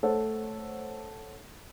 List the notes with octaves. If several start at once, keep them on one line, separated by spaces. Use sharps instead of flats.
A3 A4 C5 C#5 F#5